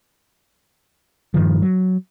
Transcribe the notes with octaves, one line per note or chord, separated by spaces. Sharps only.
G2 D#3 F3
F#3